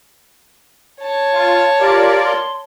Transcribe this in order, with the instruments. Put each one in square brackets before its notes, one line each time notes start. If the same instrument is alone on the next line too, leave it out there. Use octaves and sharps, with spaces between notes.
[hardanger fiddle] C#5 A5
[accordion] F4
[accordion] F4 A#4 D5 [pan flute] G4
[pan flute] C6